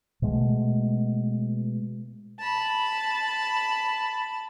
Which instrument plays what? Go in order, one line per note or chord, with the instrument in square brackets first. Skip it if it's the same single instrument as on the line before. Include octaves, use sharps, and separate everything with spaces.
[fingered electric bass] B2 G#3 A3
[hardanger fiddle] A5 B5